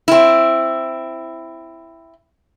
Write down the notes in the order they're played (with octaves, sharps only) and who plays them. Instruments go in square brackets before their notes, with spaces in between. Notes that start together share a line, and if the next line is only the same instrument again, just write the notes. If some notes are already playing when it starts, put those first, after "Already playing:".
[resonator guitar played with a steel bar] C4 E4